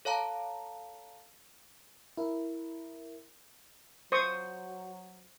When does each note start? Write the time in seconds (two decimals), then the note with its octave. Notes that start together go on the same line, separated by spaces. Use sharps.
0.05 A4 C#5 F5 A5 A#5
2.17 E4 A#4
4.12 F#3 C5 C#6 D#6